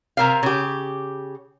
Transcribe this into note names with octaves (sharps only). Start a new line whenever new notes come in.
C3 A#4 F5
C#3 G4